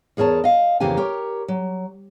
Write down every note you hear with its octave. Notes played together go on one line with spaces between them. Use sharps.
E2 G#4 A#4 C#5 A5
D#5 F5
F2 C#3 E3 A#3 G4 G#5
G4 A#4 C#5
F#3